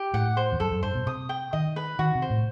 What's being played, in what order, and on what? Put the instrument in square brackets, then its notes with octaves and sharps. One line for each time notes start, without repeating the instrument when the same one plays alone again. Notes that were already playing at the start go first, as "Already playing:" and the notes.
Already playing: [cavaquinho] G4
[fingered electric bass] A2 [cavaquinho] F#5
[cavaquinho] C5
[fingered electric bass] E2
[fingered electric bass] F#2 [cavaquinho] A4
[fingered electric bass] F#2
[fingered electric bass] G2 [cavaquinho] C5
[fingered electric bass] B2
[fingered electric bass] C3 [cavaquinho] D#6
[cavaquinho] G5
[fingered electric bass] D#3 [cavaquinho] D#5
[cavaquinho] B4
[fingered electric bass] D#3 [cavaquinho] F#4
[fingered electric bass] C3
[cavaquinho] C5
[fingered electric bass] A2